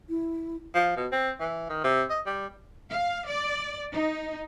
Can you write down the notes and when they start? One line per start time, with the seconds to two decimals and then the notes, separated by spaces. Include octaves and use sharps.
0.09 E4
0.75 F3
0.96 B2
1.12 C4
1.40 E3
1.69 D#3
1.84 C3
2.10 D#5
2.26 G3
2.90 F5
3.26 D5
3.93 D#4